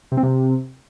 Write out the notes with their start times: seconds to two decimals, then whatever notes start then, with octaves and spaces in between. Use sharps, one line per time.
0.12 C3
0.17 C4
0.23 C3